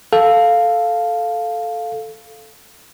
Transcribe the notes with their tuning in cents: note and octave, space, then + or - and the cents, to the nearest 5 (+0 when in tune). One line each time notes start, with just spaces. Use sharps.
A4 -5 F5 +0